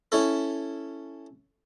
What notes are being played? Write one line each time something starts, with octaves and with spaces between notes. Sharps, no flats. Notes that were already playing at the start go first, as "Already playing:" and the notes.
C#4 E4 A4